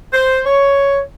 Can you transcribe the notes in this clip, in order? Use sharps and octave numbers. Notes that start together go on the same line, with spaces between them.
C5
C#5